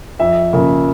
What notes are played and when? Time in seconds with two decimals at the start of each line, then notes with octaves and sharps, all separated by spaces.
0.19 F2 E5
0.53 C#3 F3 A#3